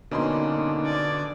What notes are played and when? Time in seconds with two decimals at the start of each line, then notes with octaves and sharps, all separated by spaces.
0.11 B2 D3 A#3 C#4 D#4 B5 C6
0.85 D5 G#5